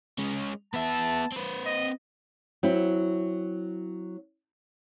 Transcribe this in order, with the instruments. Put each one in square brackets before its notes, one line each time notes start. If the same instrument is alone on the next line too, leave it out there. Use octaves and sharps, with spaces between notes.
[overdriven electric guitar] G#3 C#4
[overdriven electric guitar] B3 E5 [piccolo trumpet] A5
[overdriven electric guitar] C4 B4
[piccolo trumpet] D#5
[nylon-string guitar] F#3 C4 E4